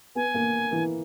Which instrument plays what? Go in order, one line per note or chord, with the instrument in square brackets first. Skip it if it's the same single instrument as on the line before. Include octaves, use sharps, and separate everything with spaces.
[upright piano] B3 [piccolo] G#5
[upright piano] A#3
E3